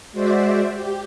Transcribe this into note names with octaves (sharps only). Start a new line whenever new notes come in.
G#3 F#4 C5 D5 E5
G4